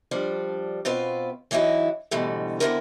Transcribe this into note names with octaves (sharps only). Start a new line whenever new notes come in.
F3 G3 D4
B2 C4 F4 B4
E3 F#3 D#4 E4 F#4
G#2 B2 D3 E3 G3 A3
D3 B3 C4 E4 F#4 A#4